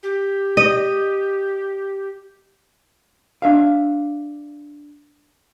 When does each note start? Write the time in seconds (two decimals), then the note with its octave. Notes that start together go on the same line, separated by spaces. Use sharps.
0.03 G4
0.57 D#5
3.42 D4 E5 F5